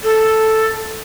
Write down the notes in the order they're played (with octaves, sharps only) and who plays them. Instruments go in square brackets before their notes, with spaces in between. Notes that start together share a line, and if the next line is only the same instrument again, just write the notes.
[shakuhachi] A4